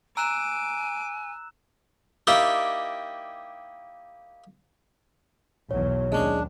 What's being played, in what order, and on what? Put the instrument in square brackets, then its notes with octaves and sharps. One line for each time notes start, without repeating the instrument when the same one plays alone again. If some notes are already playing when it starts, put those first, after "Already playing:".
[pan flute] G#5 [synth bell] A#5 [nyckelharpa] D6 [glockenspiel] E6 F#6 E7
[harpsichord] A#3 D#4 E4 G4 D5 G5
[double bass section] B1 E2 F#3 [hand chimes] C#5
[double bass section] D#2 [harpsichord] G#3 C#4 G#4 [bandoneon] D4